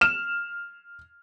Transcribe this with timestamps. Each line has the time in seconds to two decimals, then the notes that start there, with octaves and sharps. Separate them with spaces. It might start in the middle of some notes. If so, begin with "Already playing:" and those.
0.01 F6 E7